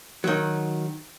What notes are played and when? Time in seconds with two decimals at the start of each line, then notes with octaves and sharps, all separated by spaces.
0.24 D#3 F#3